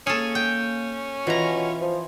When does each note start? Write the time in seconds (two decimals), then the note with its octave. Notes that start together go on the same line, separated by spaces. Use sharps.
0.07 A#3 C#4 G#4 A4
0.35 G5
1.27 B2 E3 F4 A#5
1.81 F3